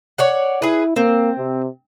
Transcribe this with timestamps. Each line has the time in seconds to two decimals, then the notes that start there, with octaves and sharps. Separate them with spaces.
0.18 C#5 D5 F#5
0.62 E4 G#4 B4
0.96 A#3 C4
1.37 C3